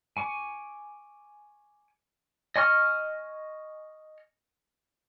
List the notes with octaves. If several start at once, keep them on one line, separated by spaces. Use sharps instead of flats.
G#5 C#6 D6
D#5 G#5 C#6 F6